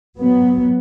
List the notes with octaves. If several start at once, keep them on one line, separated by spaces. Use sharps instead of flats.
F#3 B3